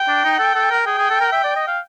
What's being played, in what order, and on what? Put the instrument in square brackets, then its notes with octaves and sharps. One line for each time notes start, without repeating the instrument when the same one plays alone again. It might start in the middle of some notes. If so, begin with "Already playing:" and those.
Already playing: [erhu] G5
[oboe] D4
D#4
A4
A4
A#4
[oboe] G#4 [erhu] G5
[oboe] G#4
A4
A#4
E5
D5
D#5
F5